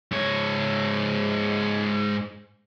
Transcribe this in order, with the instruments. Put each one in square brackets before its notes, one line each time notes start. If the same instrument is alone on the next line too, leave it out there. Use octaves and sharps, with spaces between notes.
[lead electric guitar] G#2 C#5